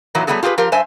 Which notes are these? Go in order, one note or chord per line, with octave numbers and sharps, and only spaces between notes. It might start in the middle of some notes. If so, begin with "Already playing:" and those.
A#2 D#3 E3 F#3 A#3
F#3 G3 A3 B3 G#4 A4
F4 G4 G#4 A#4 B4
F3 F4 G4 A#4
G2 C5 E5 G#5